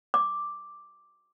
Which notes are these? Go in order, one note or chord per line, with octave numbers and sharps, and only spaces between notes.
D6